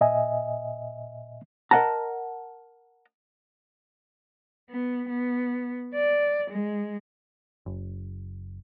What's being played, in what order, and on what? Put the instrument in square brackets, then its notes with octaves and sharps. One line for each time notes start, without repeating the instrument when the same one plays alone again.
[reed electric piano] A#2 D#5 E5 G#5
[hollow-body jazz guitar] A#4 D#5 E5 F#5 A5 A#5
[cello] B3
B3
D5
G#3
[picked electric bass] F#1